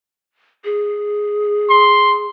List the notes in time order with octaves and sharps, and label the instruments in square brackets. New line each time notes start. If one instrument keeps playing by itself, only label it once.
[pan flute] G#4
[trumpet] C6